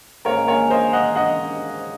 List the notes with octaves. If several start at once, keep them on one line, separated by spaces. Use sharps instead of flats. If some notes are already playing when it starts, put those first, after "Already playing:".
G#2 D#3 A#3 C#4 A#4 C#5
A#4 C#5
C5 D#5
D#5 F#5
D#5 F#5